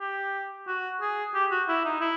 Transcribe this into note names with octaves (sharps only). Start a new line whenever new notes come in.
G4
F#4
G#4
G4
F#4
E4
D#4
E4